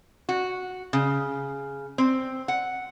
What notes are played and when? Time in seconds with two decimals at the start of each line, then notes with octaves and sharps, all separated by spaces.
0.29 F#4
0.93 C#3
1.98 C4
2.48 F#5